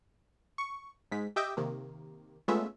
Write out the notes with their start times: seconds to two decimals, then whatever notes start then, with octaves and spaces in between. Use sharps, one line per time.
0.58 C#6
1.12 G#2 G#3 B6
1.36 G4 D#5 E5 G5 D6 G6
1.57 C3 D#3 A#3
2.48 G#3 A3 B3 C#4 F4 E5